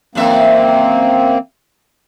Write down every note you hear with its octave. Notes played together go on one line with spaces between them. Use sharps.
F#2 E3 A#3 C4 E5